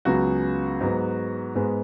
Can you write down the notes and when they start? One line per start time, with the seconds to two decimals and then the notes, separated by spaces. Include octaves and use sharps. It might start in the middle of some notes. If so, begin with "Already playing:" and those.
0.05 C#2 C#3 F#3 B3 F#4
0.81 G#2 F#3 B3
1.55 G#2 G#3 B3